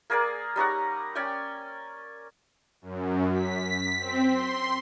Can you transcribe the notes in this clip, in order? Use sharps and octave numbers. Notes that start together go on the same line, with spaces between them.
A#3 G#4 A#4 D5
G3 D#4 C#5 F#5
C#4 D5 G5 G#5
F#2
B6
C4
C6